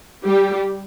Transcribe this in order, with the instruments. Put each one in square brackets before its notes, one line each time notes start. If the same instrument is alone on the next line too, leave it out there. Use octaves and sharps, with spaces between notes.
[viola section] G3 G4